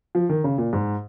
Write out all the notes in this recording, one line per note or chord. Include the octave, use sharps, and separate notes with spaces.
F3
D#3
C#3
A#2
G#2